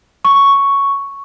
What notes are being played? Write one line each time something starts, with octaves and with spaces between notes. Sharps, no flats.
C#6